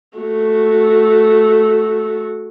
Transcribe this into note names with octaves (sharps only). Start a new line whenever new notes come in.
A3 F#4